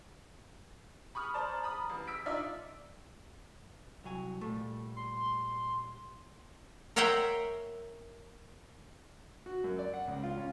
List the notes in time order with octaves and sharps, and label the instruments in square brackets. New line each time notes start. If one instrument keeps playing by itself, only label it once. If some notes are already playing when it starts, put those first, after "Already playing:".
[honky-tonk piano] B5 C#6 D#6 F6
C5 D5 A5 A#5
A#5 B5 D#6
A1
E6 B6 D7
D4 D#4 F4 D5 E5
[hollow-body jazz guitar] C2 F#3 G#5
A#2 G3 A3
[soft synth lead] C6
[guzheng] A#4 C#5 E5 F#5 G5 C6
[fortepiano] F#4
F#2
D5
F#5
C#2
F4
C#4